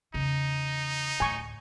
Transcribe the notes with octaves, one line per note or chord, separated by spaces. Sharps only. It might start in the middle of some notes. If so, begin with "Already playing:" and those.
E2 C#3 D#4
D2 A2 G#5 C#6